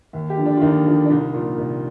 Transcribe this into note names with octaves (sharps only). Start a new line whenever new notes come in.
D#2
G4
D3 F3
D4
F4
D#2 D#4
D3 F3
D4
C2 D#4
A#2 F3
C2